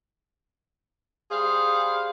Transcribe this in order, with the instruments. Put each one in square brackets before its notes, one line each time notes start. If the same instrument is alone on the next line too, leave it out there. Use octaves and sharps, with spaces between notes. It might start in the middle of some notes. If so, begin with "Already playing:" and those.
[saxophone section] G3 C5 F5 [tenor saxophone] G#4